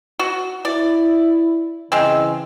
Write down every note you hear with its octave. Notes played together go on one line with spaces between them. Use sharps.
F#4
E4 D5
C#3 E3 G#3 C4